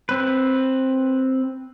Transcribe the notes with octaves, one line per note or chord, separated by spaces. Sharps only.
C4 B4